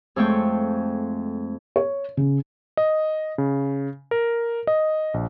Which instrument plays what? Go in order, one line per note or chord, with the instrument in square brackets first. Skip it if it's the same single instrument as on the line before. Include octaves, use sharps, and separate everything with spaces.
[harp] F2 G#3 A3 C4 G5 C#6
[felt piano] C#5
C#3
[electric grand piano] D#5
C#3
A#4
D#5
A#1